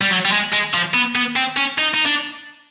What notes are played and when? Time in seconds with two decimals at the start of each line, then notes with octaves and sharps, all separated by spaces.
0.01 G3
0.11 F#3
0.25 G3
0.32 G#3
0.52 G#3
0.74 F3
0.94 B3
1.16 B3
1.36 C4
1.57 C#4
1.78 D#4
1.94 D#4
2.06 D4